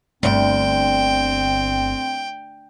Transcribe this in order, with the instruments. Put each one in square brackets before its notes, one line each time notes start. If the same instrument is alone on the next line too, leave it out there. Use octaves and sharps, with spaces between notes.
[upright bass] G1 [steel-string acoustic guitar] D2 [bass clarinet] C4 [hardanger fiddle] G5